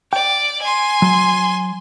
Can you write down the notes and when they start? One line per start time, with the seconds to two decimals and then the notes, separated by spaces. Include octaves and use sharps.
0.13 D5 G5
0.61 G#5 C6
1.02 F#3